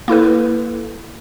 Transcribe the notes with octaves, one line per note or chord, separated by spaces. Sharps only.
A#3 E4 A4 B4